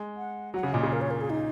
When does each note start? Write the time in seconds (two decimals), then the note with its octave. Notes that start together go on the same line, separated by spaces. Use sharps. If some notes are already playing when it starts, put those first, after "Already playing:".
Already playing: G#3
0.17 F#5
0.54 F#3 F#5
0.63 C#3
0.73 A#2 D#5
0.83 C#3
0.93 A#4
1.01 C#5
1.11 A#4
1.21 G#4
1.30 D#4